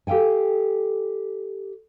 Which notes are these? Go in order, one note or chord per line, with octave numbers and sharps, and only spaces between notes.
G4 A4 F5 G5 G#5